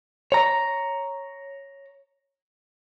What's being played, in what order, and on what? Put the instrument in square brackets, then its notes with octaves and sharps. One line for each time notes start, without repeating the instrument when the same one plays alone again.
[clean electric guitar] C#5 A#5